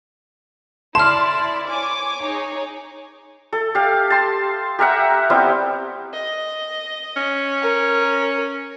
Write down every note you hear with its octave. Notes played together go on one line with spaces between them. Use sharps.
E4 D5 A5 C6 F6
C#5 G#5 D6
D#4 G#4 C#5
A4
G4 F5
A5 C6
G4 A#4 E5 F#5
G3 B3 C4 E4
D#5
C#4
A#4